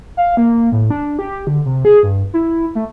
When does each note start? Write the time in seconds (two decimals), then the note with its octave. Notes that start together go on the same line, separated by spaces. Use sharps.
0.17 F5
0.37 A#3
0.72 A2
0.91 D4
1.19 G4
1.47 D3
1.65 C3
1.85 G#4
2.03 G2
2.34 E4
2.75 A3